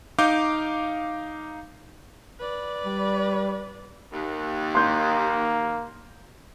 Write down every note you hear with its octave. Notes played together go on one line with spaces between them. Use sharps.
D#4 F5 D6 G6
B4 D5
G3
D#2
A#3 C6 G6